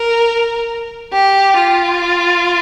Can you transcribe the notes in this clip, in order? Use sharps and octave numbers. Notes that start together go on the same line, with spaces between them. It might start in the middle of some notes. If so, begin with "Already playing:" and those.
Already playing: A#4
G4
F4